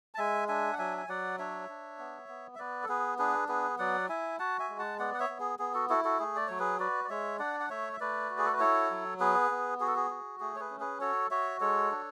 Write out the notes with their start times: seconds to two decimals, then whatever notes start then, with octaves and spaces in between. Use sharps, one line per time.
0.14 A5
0.18 G#3 E5 G#5
0.48 D4 E5 G#5
0.73 F#5
0.78 F#3 E5 G#5
0.97 G#5
1.08 F#3 D5 F#5
1.39 D4 C#5 E5
1.69 D4
1.99 B3
2.29 B3
2.55 E5
2.59 B3 B4 D5
2.83 A4
2.88 B3 G#4 B4
3.18 D4 G#4 B4
3.48 B3 G#4 B4
3.79 F#3 D5 F#5
4.09 E4 E5 G#5
4.39 F#4 F#5 A5
4.59 E5 G#5
4.69 G#3
4.79 F#5 A5
4.99 B3 D5 F#5
5.14 F#5
5.20 C#5 E5
5.29 B3
5.40 G#4
5.59 B3 G#4
5.74 F#4 A4
5.90 E4 F#4 A4
6.04 F#4 A4
6.19 A3 G#4
6.36 D5
6.48 F#3 C#5
6.59 G#4 B4
6.79 F#4 B4 D5
7.04 D5
7.09 G#3 C#5 E5
7.39 D4 D5 F#5
7.60 F#5
7.69 A3 C#5 E5
7.93 E5
8.00 A3 B4 D5
8.30 F#4
8.38 G#4
8.45 A4
8.53 B4
8.60 E4 A4 C#5
8.91 F#3
9.20 B3 G#4 B4
9.51 B3
9.80 F#4 G#4
9.87 A4
9.96 G#4
10.10 F#4
10.40 A3 G#4
10.56 C#5
10.60 G#4 B4
10.70 C#4
10.80 G#4 B4
11.01 F#4 A4 C#5
11.30 F#4 C#5 E5
11.60 G#3 A4 C#5
11.91 D4